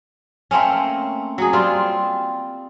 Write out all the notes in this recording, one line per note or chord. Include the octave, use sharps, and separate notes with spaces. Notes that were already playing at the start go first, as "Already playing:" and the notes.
A3 A#3 C4 C#4
F#3 G#4
G3 C4 F4